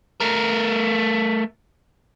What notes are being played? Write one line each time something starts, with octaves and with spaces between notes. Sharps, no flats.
A3 A#4